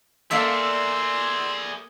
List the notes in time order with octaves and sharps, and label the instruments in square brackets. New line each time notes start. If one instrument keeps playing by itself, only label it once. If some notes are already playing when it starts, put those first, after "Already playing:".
[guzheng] A#3 A4 E5 [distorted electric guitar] G#4 D5 [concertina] C6 E6